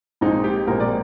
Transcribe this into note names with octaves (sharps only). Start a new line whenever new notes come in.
A#1 A#2 G#3 C4 D#4
G4
A#1 A#2 G#3 C4 A#4
D5